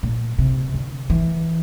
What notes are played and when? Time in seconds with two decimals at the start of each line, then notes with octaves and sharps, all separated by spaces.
0.03 A#2
0.38 C3
0.74 D3
1.10 E3